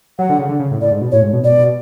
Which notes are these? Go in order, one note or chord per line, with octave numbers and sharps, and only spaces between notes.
F#3 F#5
D3
C#3
D3
C#3
A2
A2 D5
G#2
B2
A2 C#5
G#2
B2
B2 D5
B2